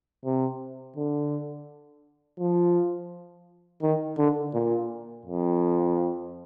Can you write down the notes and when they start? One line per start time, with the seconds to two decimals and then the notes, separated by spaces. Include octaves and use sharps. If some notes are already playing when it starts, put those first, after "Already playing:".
0.25 C3
0.96 D3
2.39 F3
3.82 D#3
4.18 D3
4.54 A#2
5.25 F2